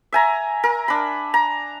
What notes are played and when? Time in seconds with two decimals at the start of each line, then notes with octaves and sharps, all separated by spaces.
0.12 E5 G#5 A#5
0.63 A#4
0.88 D4 B5
1.34 A#5